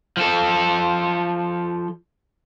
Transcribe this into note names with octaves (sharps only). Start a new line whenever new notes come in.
F3 A4